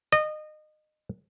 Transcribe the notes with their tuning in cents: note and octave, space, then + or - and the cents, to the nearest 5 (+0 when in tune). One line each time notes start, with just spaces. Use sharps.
D#5 -25